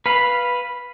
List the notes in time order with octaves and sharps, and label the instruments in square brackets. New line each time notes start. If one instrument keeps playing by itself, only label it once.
[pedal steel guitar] B4 F5 B5